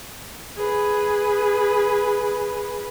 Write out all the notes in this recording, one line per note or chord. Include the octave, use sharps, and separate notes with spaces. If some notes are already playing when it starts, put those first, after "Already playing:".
G#4 B4